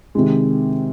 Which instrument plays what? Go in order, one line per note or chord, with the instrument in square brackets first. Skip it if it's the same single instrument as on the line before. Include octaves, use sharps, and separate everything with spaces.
[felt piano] C3 D#3 G#3